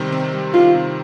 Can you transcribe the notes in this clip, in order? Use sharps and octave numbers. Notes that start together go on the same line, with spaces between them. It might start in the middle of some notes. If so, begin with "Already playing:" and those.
Already playing: C3 D#3 G3 C4
C4
G3
D#3 F4
C3